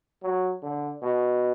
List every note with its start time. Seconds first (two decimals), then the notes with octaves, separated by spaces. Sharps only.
0.23 F#3
0.63 D3
1.02 B2